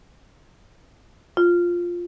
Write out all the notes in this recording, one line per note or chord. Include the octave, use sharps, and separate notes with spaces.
F4